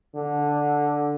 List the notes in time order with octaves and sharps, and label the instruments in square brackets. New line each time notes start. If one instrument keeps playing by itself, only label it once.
[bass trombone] D3